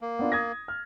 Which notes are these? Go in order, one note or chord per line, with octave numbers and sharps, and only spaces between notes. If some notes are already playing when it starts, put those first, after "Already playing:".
A#3
B3 D4 F4
D#6 G#6 A#6
F6